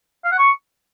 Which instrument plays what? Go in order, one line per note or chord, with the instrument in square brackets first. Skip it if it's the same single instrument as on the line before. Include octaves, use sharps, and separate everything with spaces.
[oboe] F5
F#5
C#6